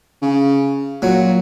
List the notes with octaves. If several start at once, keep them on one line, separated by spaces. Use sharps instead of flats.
C#3
A#2 F#3